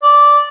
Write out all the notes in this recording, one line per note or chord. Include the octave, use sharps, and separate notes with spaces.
D5